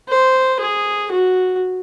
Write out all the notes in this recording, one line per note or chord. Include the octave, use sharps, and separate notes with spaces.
C5
G#4
F#4